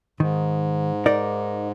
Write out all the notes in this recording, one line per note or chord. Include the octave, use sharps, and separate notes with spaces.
G#2 D#3
D#4 A#4 D5